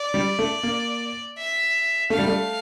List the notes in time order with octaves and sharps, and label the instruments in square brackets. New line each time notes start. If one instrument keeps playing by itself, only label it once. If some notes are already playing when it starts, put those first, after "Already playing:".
Already playing: [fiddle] D5
[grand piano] G3
A3
A#3
[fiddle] E5
[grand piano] A3 [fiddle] F5
[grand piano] G3
A3